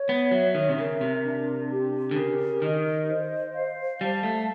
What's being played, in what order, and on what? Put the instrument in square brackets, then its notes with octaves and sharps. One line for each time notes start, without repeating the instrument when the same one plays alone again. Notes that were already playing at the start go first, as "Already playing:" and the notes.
Already playing: [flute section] C#5
[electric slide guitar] B3
[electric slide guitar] F#3 [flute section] E5
[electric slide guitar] D#3
C3
[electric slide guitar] C#3 [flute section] A#4
[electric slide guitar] C3
[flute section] D4
G4
[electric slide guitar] D3
[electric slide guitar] C#3 [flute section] A#4
[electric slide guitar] D#3 [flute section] D#5
[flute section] C5
F5
[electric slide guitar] G3 [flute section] A5
[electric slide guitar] A3